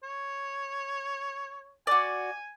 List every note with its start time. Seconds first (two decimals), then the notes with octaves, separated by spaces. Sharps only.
0.03 C#5
1.87 F#4 D5 G#5